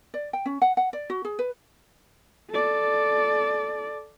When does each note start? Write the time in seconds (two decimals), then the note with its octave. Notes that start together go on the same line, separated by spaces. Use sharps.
0.14 D5
0.33 G5
0.46 C#4
0.62 F#5
0.77 F#5
0.93 D5
1.10 F#4
1.25 G#4
1.39 B4
2.50 A4 D5